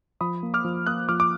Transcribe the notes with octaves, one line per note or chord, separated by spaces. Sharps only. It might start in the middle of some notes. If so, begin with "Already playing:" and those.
F3 B5 D#6
A#3
D6 F6
F3
A#3 D#6 F#6
F3 D6 F6
D6